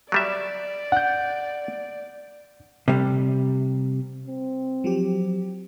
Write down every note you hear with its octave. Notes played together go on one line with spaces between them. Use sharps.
F#3 G3 D5 E5
F#5 G6
C3 G3
C4
F3 F#3 G4